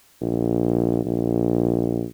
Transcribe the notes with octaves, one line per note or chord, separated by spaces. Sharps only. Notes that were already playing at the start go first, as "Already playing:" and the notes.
A#1
A#1